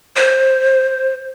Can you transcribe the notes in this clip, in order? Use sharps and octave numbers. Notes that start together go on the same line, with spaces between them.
C5